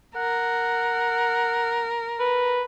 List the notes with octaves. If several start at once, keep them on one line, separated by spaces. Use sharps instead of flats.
A#4 F#5
B4